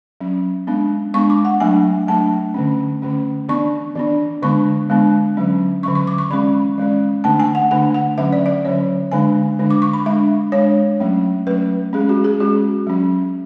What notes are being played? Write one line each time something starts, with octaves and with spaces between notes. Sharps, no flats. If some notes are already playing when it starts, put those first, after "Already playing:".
F#3 C#4
G#3 B3 D4
G#3 B3 D4 C#6
D6
F#5
F#3 A3 D4 G#5
F#3 A3 D4 A5
D3 A3 C#4
D3 A3 C#4
E3 B3 D4 C#6
E3 B3 D4
D3 G#3 B3 D4 C#6
D3 G#3 B3 D4
D3 F#3 C#4
D3 F#3 C#4 C#6
C#6
D6
C#6
E3 G#3 C#4 B5
E3 G#3 C#4
D3 A3 D4 A5
G#5
F#5
D3 A3 D4 F#5
F#5
D3 F#3 C#4 E5
D5
E5
D3 F#3 C#4 C#5
D3 G#3 D4 G#5
D3 G#3 D4
D6
C#6
B5
G#3 D4 E5
G#3 D4 C#5
F#3 A3 C#4
F#3 A3 C#4 B4
G#3 C#4 G#4
F#4
G#4
G#3 C#4 F#4
F#3 C#4